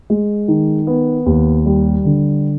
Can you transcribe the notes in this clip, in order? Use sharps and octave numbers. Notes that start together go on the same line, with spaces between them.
G#3
D#3
B3
D#2
G3
D3